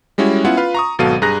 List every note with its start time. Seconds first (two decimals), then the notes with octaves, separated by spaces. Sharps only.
0.18 G3 G#3 C#4 E4 F#4
0.45 B3 C#4 E4 F4 F#5
0.57 F4 B4 F5
0.75 A#5 C#6 D#6
0.99 G#1 B2 F#3 A4 F5 D#7
1.22 G2 G#4 A#5 F#6 A#6